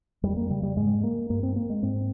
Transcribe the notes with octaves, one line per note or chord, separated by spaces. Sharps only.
F2 G3
A#3
C#3 G3
G3
G#2 G#3
A#3
G2 A#3
C4
A#3
G#3
G#2 C4